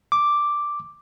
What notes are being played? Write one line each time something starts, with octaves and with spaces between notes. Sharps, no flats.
D6